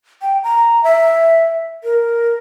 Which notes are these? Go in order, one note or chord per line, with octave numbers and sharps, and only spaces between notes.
G5
A#5
E5
A#4